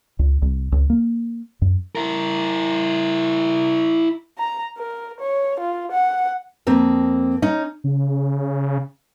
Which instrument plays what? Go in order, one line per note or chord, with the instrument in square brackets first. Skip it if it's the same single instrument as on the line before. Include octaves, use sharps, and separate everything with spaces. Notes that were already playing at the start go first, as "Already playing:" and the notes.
[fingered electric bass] C#2
C2
C#2
A#3
F#2
[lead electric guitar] E4 A#4
[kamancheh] A#5
A#4
C#5
F4
F#5
[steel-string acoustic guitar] F2 A#3 C4
C#4 D#4
[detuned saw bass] C#3